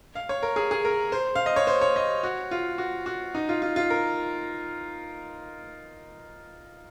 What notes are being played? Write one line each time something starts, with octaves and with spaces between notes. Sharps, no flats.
F5
C#5
A#4
G#4
G#4
A#4
C5
F5
D#5
C#5
C5
C#5
D#5
F#4
F4
F#4
F#4
D#4
F4
F4
F4
A#4